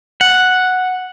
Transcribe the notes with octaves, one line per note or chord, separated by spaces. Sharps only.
F#5